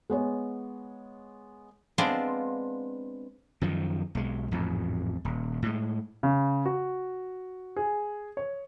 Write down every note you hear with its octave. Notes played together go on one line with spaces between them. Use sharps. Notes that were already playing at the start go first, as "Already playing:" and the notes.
G#3 B3 C#5
G#3 B3 C4 D4 F4
F#2 D#3 F3
B1 G#3
A1 F2 G#2
D#1
A2 G#3
C#3
F#4
G#4
C#5